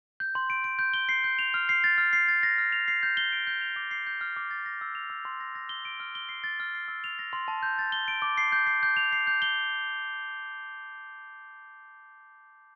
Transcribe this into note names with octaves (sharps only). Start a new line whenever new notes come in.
G6
C6
D7
D7
G6
G7
C7
G6
F7
F6
C7
A6
F6
C7
A6
A#6
F6
F7
C7
G6
G7
D7
G6
F7
D6
C7
G6
F6
D6
A6
A#6
E6
F7
E6
C6
A#6
A#6
G7
D7
F6
G7
C7
A6
F6
C7
E6
F7
A#6
C6
A5
G6
A6
G7
D7
D6
C7
G6
C7
G6
F7
C7
G6
G7